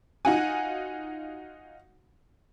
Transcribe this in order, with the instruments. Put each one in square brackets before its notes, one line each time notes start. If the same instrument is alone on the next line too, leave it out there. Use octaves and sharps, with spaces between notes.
[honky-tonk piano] D#4 F4 F#4 F#5 G#5